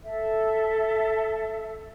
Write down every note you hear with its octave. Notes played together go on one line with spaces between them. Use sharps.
A4 E5